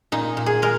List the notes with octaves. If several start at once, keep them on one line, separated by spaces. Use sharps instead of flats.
A#2 D#4
A#2
G#4
G#3 A#4